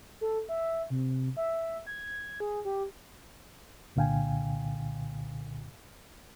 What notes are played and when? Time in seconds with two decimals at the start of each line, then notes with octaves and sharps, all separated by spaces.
0.21 A4
0.49 E5
0.90 C3
1.37 E5
1.87 G#6
2.40 G#4
2.65 G4
3.96 C2 A#2 D3 F5 G5 G#5